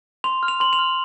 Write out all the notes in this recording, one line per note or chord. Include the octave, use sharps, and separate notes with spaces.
C6 F7
F6
F7
C6 F#7
F7
F6